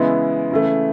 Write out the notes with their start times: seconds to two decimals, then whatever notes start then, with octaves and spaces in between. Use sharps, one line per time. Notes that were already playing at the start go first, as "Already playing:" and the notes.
Already playing: C#3 E3 G#3 B3 E4
0.51 C#3 E3 A3